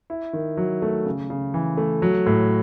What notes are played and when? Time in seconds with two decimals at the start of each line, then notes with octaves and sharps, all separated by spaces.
0.10 E4
0.33 D#3
0.57 F#3
0.82 A3
1.05 C#3
1.30 C#3
1.54 E3
1.77 A3
2.02 F#3
2.26 A2